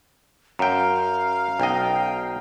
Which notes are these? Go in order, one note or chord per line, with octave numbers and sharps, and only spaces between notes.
F#2 F5 G5 A#5
B1 D#5 G5